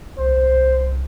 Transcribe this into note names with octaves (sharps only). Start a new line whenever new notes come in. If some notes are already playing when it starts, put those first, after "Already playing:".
C2 C5